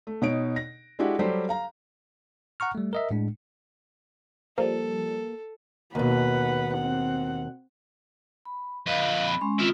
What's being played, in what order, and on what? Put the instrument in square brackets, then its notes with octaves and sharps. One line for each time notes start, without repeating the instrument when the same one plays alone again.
[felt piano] A3
B2 D#4 C#5 D7
A#6
G#3 D4 E4 F#4 G4
F#3 G3 G4 A4 C5
F5 A#5
[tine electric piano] F#5 A#5 C#6 F6
G3 A3
A#4 D#5 E5
A2 G#3 D4
[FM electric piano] F3 G3 [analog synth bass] A#3 [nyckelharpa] A4 [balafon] C5
[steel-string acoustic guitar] D#2 B2 [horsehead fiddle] B4 F#5
[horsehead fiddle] C4 F#5
[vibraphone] B5
[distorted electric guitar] F2 B4 [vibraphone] D#5 F5
[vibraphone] B5
G#3 C#4 C6
[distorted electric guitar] D#3 E4 [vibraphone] C4 F4 D#6